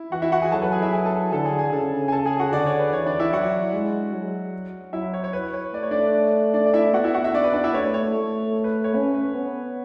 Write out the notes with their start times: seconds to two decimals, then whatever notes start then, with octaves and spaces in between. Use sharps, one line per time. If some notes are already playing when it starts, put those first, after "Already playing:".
Already playing: E4
0.12 E3 F#4 F#5
0.22 E4 E5
0.32 F#4 F#5
0.42 G#4 G#5
0.52 F#3 A4 A5
0.62 B4 B5
0.72 G#4 G#5
0.82 E4 E5
0.93 G#4 G#5
1.06 A4 A5
1.32 D3 A4 A5
1.45 G#4 G#5
1.59 G#4 G#5
1.73 C#3 A4 A5
2.08 G#5
2.12 A4 A5
2.26 G#4 G#5
2.39 F#4 F#5
2.52 D3 D4 D5
2.66 C#5
2.79 B4
2.92 E3 C#5
3.06 D4 D5
3.19 E4 E5
3.33 F#3 F#4 F#5
3.73 G#3
4.13 F#3
4.93 F#3 E4 E5
5.14 C#5
5.24 C#5
5.33 B4
5.54 C#5
5.74 A3 D5
5.83 C#5
5.91 D4 D5
6.54 D4 D5
6.66 D5
6.74 E4 E5
6.93 B3 F#4 F#5
7.04 E4 E5
7.14 F#4 F#5
7.24 E4 E5
7.34 D4 D5
7.44 B4
7.54 D4 D5
7.64 E4 E5
7.74 A3 C#5
7.94 C#5
8.14 A3
8.64 B4
8.84 C#5
8.95 C#4 B4
9.15 B4
9.35 B3